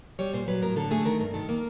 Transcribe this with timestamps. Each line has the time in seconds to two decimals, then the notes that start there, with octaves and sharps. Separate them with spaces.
0.19 G3 C#5
0.34 A#2 C5
0.48 F#3 B4
0.62 A2 A#4
0.76 D3 A4
0.91 A3 G#4
1.05 D#3 A#4
1.20 G2 A#4
1.34 D#3 A4
1.49 A#3 A#4